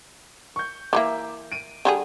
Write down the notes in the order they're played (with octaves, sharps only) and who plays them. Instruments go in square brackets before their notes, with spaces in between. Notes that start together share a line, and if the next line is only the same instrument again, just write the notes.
[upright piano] C#6 G6
[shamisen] E3 F3 A#3 [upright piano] E5 A#5 D6
[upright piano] D7 D#7
[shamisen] D3 G3 G#4